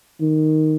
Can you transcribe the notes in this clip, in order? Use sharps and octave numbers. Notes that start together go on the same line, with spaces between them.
D#3